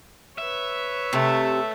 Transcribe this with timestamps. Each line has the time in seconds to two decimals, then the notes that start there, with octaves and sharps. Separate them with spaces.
0.38 B4 C#5 E5
1.13 C3 A3